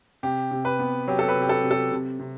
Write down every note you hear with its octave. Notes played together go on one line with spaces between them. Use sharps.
C3 G4
C3
B4
B3
F#3 G4
A4
B4
C3
G4
A4
C3
A4
C3
C3